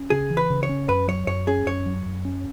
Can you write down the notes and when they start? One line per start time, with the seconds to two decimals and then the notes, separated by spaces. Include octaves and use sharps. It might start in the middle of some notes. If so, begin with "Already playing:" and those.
Already playing: C#4
0.10 C#3 G#4
0.30 E3
0.37 B4
0.50 C#3
0.63 C#5
0.69 C#4
0.89 F#2 B4
1.08 F#3 C#5
1.27 F#2 C#5
1.47 C#4 G#4
1.66 F#2 C#5
1.86 F#3
2.06 F#2
2.25 C#4